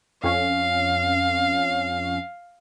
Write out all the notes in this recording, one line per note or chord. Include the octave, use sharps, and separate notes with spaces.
F2 C#4 F5